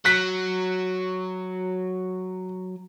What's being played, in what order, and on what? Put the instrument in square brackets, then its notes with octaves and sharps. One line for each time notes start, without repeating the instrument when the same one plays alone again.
[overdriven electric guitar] F#3 [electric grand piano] F#6 B6